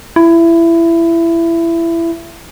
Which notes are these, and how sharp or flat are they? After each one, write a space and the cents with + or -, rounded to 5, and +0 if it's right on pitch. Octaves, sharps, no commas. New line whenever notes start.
E4 +20